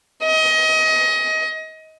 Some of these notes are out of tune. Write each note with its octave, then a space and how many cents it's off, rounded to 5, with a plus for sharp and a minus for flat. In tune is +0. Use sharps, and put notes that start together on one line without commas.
D#5 +25